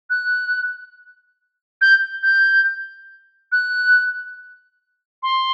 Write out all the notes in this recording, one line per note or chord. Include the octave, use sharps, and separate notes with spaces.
F#6
G6
G6
F#6
C6